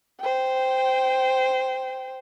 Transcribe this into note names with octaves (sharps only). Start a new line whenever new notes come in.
C5 G5